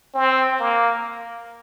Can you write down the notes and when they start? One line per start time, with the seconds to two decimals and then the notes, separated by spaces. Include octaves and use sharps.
0.14 C4
0.60 A#3